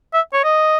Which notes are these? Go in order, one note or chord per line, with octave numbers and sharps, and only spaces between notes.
E5
C#5
D#5